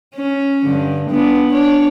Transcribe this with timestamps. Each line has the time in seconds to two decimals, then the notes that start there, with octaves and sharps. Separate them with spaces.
0.15 C#4
0.64 G2 D3
1.11 B3 D4
1.49 D4 C#5